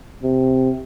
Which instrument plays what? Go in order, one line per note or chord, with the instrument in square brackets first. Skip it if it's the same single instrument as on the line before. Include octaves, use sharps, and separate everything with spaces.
[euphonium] C3